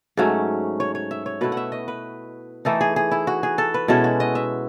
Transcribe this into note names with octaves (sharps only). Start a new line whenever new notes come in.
G#2 F#3 A3 C#4
C#5
C#5
E5
C#5
B2 A3 E4 B4
F#5
E5
D#5
B4
E3 A3 D#4 A4
G#4
G#4
E4
F#4
G#4
A4
B4
B2 G#3 C#4 E4 A4
F#4
D#5
E5